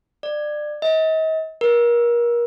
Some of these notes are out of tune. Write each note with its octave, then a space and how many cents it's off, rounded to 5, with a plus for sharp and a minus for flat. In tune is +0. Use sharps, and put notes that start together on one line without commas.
D5 +25
D#5 +40
A#4 +30